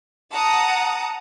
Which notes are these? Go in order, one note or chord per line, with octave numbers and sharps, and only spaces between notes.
F#5 A5 A#5 D#6